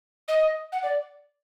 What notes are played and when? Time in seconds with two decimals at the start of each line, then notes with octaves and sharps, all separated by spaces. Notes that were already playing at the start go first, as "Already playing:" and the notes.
0.28 D#5
0.72 F#5
0.83 D5